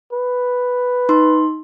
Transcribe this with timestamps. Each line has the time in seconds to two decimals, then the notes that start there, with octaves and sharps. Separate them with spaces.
0.13 B4
1.09 D#4 C6